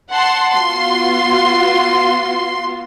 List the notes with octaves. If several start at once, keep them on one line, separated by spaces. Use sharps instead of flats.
F#5 A5 C6
B3 F4 F#4 C6